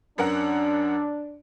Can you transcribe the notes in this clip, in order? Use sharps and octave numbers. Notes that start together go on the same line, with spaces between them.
F#2 D4 A#4 F#5